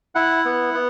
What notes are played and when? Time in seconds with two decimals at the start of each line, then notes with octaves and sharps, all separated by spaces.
0.15 E4 F#5
0.45 B3
0.74 B3